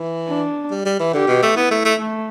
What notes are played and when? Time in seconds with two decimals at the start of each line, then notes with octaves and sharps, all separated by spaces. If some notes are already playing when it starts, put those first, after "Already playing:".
Already playing: E3
0.28 D4
0.71 G3
0.85 G3
1.00 E3
1.13 D3 G4
1.28 B2
1.42 A3
1.57 B3 E4
1.71 A3
1.85 A3
2.00 A3